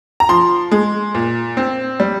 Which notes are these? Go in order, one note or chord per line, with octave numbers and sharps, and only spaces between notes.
A#5
F3 C6
G#3
A#2
C4
G3